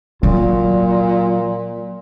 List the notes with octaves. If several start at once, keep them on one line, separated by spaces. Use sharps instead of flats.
A#2 F#3